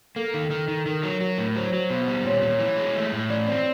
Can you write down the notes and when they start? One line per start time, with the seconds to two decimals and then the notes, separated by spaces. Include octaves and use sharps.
0.16 A#3 A4
0.34 D#3
0.51 D#3
0.68 D#3
0.86 D#3 A#4
1.03 F#3
1.21 F#3
1.38 A2
1.56 F#3 C5
1.73 F#3
1.90 B2
2.08 G3
2.25 A#2 C#5
2.42 A#2
2.59 E3
2.77 G#3
2.95 A3
3.12 A2
3.29 E3 D5
3.48 C4